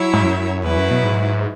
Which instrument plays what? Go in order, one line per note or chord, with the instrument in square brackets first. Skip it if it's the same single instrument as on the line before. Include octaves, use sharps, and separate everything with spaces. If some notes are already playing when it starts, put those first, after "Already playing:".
Already playing: [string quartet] F#3 E4 C#5 E5
[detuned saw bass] G#2
F#2
[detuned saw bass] E2 [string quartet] F#3 E4 B4
[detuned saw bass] F#2
B2
G#2